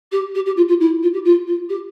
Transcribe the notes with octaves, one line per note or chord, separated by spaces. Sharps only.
G4
G4
G4
F4
F4
E4
F4
G4
F4
F4
G4